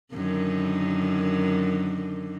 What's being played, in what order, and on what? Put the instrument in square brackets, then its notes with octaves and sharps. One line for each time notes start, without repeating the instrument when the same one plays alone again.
[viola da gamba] F#2 D3 D#3